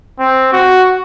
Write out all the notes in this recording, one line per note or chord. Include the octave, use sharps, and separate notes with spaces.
C4
F#4